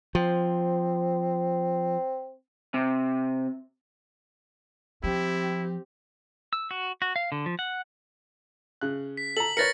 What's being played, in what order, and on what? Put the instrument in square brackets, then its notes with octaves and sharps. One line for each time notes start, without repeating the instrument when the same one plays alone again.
[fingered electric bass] F3 [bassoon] C4
[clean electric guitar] C3
[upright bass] F3 [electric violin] C4 G4 [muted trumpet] E4
[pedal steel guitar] E6
F#4
F#4
F5
D3
F3
F#5
[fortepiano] C#3 F#6
[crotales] B6
[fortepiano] A4 A#5 [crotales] F#7
[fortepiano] A#4 B4 C#5 [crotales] A6 A#6 C#7